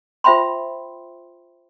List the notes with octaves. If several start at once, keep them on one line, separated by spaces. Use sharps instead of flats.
F4 C5 E5 G5 B5 C6